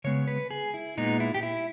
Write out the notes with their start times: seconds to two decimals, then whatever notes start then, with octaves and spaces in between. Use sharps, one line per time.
0.04 C#3 G#3 B3 C#5
0.28 B4
0.51 G#4
0.74 E4
0.97 A#2 G#3 B3 D#4
1.20 E4
1.34 G4
1.43 E4